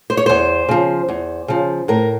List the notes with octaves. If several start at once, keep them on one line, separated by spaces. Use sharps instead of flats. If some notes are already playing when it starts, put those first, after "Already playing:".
C5
C#5
E2 C5
C#3 F3
E2
C#3 F3
A2 A#4